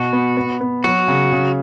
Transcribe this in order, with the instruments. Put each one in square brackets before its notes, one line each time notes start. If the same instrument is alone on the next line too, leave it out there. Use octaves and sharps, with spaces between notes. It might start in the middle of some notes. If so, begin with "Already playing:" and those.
Already playing: [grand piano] B2 [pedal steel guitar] F#4
[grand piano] B3
B3
B3
[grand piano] F#3 [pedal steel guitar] F#4
[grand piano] C#3
C#3